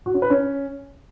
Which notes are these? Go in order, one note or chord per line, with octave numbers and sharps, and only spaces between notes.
F#4
C#4
B4
C#4